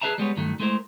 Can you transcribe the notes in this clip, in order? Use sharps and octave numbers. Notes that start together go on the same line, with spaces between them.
G#4 B4 C5 E5 A5 A#5
G3 G#3 B3 C#5
G2 D#3 F#3 A3
G#3 A3 E4 A#4 C5